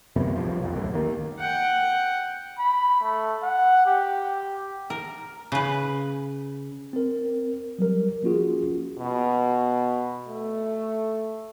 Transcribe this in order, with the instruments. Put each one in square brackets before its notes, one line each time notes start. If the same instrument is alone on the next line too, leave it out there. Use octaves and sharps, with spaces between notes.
[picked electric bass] F#2 C3 A3 B3
C2 G2 F3
B1 F2
D#1 C#2 F#2 A2
D#3 A#3
[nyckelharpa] F#5 G5
[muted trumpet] B5
A3
F#5
G4
[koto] A#4
C#3 B4
[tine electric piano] C4 A#4
F#3 G3 A#4
F3 A#3 C#4 F4 F#4 G#4
[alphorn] B2
A3